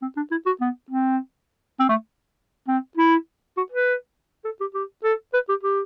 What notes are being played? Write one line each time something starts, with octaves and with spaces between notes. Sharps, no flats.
C4
D4
E4
F#4
B3
C4
C4
A3
C4
E4
F#4
B4
A4
G4
G4
A4
B4
G4
G4